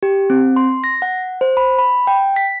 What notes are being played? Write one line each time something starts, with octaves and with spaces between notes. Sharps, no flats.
G4
C4
C6
A#6
F#5
C5
B5
B5
G5
B6